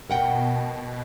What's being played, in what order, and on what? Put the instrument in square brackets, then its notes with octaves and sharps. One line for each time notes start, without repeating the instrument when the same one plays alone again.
[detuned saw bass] B2 [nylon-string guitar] A#4 F#5 G5